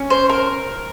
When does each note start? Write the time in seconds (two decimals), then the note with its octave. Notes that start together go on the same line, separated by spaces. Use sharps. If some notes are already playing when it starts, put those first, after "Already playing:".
Already playing: C#4
0.10 C5
0.29 A#4